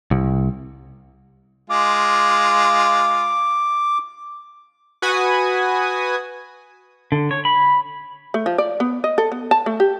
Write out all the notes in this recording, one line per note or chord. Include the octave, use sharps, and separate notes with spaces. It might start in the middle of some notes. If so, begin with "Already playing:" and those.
C2
G#3 F4 D6
F#4 B4 G#5 D#6
D3
C#5
B5
A3
F3
D5
B3
D#5
A4
B3
A5
A3
G4